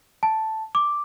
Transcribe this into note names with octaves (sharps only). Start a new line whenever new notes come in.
A5
D6